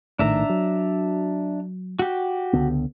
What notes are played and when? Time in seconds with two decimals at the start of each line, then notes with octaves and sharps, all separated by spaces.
0.19 A#1 A2 D#3 D4 E5 A#5
0.49 F#3
1.99 F#4 G4
2.53 C#2 D3 B3